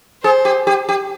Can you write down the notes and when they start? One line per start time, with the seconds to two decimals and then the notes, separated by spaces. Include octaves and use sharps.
0.23 G#4 C5
0.45 G4
0.67 G4
0.89 G4